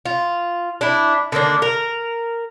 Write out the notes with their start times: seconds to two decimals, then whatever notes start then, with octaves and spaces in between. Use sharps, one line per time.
0.06 F4
0.81 D4 E4
1.32 D3 D#3 A#3 D4
1.62 A#4